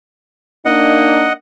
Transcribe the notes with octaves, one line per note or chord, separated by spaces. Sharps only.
A#3 D4 D#4 D#5 F#5